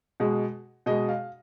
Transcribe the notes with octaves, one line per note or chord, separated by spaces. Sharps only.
B2 G#3
B2 G#3 D#5
F5